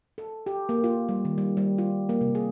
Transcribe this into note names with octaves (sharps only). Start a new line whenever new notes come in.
A4
G4
A#3
F4
G3
D#3
G3
G3
F4
A#3
C3
G#4